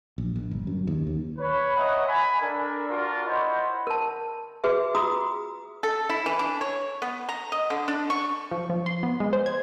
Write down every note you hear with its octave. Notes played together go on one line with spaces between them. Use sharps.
A#1
A#1
G1
F#2
D#2
D#2
B4 C#5 B5
C#5 D#5 E5 F#5 G#5 A#5
G#5 B5
D4 A4 A#4
D4 F4 F#4 A#4
E4 C5 C#5 D#5 F#5 B5
A#4 A5
F#4 G#4 B4 E5
F4 F#4 G#4 A#5 D#6 E6
A4
E4
E3
D4
C#5
B3
A#5
D#5
D3
D4
C#6
F3
F3
C6
B3
G#3
C5
G#6